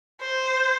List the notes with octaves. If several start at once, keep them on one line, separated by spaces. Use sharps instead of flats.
C5